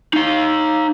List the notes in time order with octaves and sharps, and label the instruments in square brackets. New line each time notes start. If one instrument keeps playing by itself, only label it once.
[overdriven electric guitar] D#4 F5